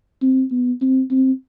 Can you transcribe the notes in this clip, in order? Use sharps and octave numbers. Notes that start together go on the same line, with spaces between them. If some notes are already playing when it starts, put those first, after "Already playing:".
C4
B3
C4
C4